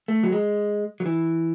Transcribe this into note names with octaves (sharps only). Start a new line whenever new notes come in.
A3
F#3
G#3
F#3
E3